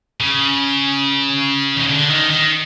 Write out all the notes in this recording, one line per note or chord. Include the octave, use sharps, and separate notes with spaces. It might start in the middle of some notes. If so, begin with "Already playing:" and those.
C#3
D#3
D3
D#3
D#3